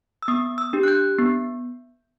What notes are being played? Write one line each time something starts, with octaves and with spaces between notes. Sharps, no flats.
E6
B3 D#6
E6
D4 G4
F#6
G6
B3